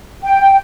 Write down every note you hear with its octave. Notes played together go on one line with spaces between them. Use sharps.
G5